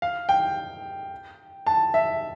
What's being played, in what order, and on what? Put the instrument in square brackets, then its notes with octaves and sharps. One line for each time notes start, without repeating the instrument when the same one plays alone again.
[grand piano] F5
G5
A5
E5